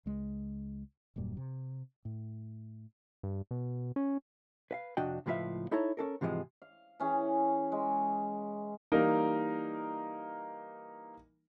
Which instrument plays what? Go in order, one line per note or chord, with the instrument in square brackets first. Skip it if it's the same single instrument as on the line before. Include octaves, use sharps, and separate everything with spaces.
[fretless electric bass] C#2 G#3
D#1 F#2 A#2 G3
C3
A2
[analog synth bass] G2
B2
C#4
[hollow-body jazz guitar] B4 E5 F5
F2 C3 D4 F#4 D#5 G5
C#2 A2 F3 B4 E5 F5
D#4 E4 A4 C#5 A#5
C#4 D4 A4 A#4
G#2 C3 E3 F3 G#3
[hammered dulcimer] F5
E3 C#4 G#4
G#3
[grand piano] E3 G3 A#3 D#4 A#4